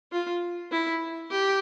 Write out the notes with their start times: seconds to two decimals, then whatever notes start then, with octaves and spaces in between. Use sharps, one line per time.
0.12 F4
0.72 E4
1.31 G4